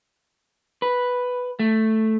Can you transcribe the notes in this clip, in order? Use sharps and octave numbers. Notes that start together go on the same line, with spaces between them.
B4
A3